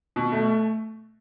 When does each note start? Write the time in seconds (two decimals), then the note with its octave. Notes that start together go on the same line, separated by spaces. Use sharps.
0.16 B2
0.32 A3